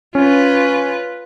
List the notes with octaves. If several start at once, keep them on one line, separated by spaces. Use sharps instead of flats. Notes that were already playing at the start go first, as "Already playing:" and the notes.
C#4 F4 B4